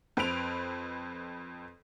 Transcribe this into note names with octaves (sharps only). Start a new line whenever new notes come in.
F2 B4 C5 D7 F7